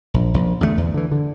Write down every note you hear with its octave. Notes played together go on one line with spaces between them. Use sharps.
A#1
A#1
E2 D3 D#3 A3
E2
D3 E3
D3